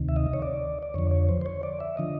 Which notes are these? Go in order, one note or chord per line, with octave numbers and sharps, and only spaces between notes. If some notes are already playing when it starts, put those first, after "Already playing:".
Already playing: D2 C3 D#3
E5
D#5
C#5
D5
D5
F2 D3 F3 C#5
C#5
C5
C5
C#5
D5
E5
D3 F3 D#5